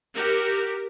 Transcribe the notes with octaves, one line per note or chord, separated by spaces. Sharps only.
F#4 G4 A#4